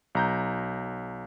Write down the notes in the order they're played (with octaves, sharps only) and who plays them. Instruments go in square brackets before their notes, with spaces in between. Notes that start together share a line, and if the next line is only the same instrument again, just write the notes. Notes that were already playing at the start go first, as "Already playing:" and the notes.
[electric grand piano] B1 A#5 G6